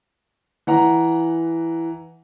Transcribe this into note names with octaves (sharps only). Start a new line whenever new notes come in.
E3 F#5 A#5